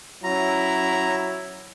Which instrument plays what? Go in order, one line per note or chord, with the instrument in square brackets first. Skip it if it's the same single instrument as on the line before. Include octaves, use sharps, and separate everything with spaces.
[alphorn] F#3 [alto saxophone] C#4 [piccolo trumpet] E4 [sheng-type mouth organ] A#5